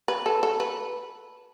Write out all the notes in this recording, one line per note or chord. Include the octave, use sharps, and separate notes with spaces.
B4
A4
A4
B4